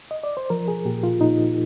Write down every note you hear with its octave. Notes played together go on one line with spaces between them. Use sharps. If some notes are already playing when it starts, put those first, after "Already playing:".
D#5
D5
C5
F3 A#4
G#4
A#2 G4
F4
A#2 D#4